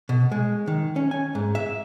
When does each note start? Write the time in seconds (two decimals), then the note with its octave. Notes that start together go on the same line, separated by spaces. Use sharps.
0.09 B2
0.32 G#3
0.67 D#3
0.96 C#4
1.11 G#5
1.35 G#2
1.55 E5